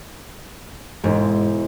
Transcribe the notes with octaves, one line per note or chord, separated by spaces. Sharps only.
E1 G#2